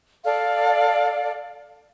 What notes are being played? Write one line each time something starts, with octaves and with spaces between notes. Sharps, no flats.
A4 D5 F5